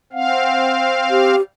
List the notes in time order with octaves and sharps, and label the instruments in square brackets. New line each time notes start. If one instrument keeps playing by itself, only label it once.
[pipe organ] C4 F5 [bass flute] F#5
[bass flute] G4